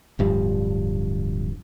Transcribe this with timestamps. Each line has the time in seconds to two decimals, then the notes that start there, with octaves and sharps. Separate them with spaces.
0.19 D1 G2 F3